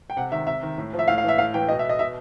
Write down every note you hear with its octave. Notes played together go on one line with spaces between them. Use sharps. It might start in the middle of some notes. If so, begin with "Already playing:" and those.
G5
C3 F#5
D#3 E5
C3 E5
D#3
A2
F3
E5
A2 F5
F5
E3 E5
A2 F5
E3 G5
B2 D#5
E5
D#5
B2 E5